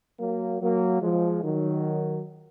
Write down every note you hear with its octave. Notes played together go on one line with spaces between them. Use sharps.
F#3 A#3
F#3 A#3
F3 G#3
D#3 F#3